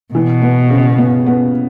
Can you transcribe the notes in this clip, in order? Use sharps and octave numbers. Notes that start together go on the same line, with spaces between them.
B2 E3
B3
C#3
B3
B3